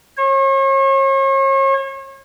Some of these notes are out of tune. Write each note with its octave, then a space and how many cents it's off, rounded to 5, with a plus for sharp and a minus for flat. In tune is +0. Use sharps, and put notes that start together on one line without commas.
C#5 -40